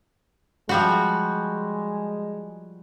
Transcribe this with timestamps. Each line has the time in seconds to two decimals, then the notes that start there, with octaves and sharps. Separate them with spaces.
0.69 F3 G3 G#3 F#4